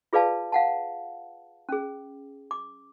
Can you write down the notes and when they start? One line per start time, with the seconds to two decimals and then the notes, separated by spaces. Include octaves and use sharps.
0.13 F4 G#4 B4 D5 F5 A5
0.52 F5 F#5 A5
1.69 C#4 G#4
2.51 D6